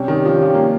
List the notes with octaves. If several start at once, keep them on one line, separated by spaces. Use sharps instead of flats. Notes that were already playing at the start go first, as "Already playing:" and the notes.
Already playing: C3 G3 C#4 G4
D#3
F3
F3
A#3